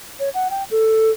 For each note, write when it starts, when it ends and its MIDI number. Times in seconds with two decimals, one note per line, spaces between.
0.20 0.29 73
0.34 0.48 78
0.50 0.64 79
0.71 1.11 69